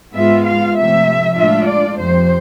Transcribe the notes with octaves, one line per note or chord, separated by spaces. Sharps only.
G#2 G#3 B3 F4 E5
F5
C3 F3 A3 E5
A2 G#3 D4 F4 E5
D5
F2 C3 F3 C5